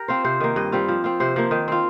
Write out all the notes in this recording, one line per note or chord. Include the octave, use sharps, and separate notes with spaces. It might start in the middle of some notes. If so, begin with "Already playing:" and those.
Already playing: G4 A#4
C4 F4 C5
C3 C5
D#3 A#3
G2 D#5
G3 C4 F4
F3
C4 F4
C3 C5
F3 A#3
D#3
C4 F4